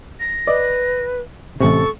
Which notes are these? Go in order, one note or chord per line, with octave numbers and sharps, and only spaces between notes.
A#6
B4 D5 D#5
A1 C3 A4 C#6